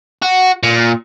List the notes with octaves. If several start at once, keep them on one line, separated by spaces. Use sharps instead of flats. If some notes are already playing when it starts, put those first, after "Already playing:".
F#4
A#2